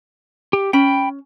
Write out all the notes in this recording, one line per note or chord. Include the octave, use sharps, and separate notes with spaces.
G4
C#4 G5 B5